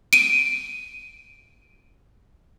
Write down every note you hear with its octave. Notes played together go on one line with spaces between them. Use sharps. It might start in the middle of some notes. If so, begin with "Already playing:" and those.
D7 D#7